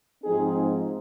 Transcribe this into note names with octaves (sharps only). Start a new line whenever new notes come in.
G#2 F3 C4 D#4 G#4